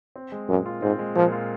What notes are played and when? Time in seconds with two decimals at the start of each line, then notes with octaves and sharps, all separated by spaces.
0.16 C4
0.32 G#3
0.48 F#2 A#2
0.66 F4
0.82 G#2 C4
0.99 G#3
1.16 A#2 F3
1.32 F4